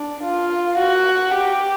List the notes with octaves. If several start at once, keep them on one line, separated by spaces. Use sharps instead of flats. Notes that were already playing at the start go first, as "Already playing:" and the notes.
Already playing: D4
F4
F#4
G4